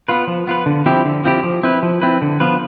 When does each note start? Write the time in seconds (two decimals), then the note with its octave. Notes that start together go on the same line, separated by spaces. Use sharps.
0.08 B3 F4 B4
0.27 F3
0.47 B3 F4 B4
0.66 D3
0.86 F3 C4 E4 G4
1.05 D3
1.24 F3 C4 E4 G4
1.43 F3
1.63 C4 E4 B4
1.83 F3
2.01 C4 E4 B4
2.22 D3
2.40 F3 B3 F4 B4